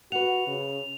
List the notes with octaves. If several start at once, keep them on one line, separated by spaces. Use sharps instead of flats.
F#4 B4 F#5 F7
C#3